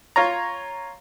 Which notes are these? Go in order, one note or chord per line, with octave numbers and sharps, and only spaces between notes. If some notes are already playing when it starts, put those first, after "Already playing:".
F4 C#5 A#5